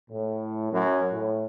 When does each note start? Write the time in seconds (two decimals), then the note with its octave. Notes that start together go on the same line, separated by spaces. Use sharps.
0.10 A2
0.72 F#2
1.12 A2